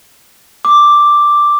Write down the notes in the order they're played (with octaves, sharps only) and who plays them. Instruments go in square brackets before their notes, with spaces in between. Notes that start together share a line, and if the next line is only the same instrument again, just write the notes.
[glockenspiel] D6